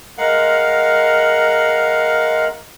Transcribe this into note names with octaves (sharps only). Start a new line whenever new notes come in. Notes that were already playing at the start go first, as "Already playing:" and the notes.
G#3 A#4 F5 F#5